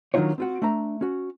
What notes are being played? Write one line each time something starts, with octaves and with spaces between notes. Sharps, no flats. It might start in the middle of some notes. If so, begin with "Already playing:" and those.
D#3 F#3 D4 D#4 F4 C#5
C4 F4 F#4
A3 D4 E5 A#5
C#4 F#4